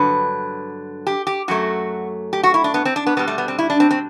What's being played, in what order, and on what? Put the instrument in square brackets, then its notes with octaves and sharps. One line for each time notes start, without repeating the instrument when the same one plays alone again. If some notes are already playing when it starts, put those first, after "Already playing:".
Already playing: [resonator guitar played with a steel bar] G2 D3 F#3 B4
G4
G4
F#2 F#3 A3 F#4
G4
F#4
E4
D4
B3
C4
D4
B3
B2 G3 B3
A3
B3
C4
E4
D4
C4
C4